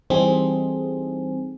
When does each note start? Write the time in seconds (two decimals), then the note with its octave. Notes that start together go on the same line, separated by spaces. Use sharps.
0.10 E3 G3 C4 D#4 G#4 A4